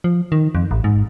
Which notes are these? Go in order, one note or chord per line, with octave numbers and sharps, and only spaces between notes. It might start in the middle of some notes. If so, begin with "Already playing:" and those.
F3
D#3
F2
A1
G#2